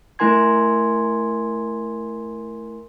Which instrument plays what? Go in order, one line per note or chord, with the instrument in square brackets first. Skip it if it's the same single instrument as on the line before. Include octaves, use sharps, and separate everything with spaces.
[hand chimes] A3 E4 A#4 G#5 C6 G#6